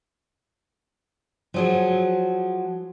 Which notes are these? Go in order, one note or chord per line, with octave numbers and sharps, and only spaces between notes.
F3 F#3 G#4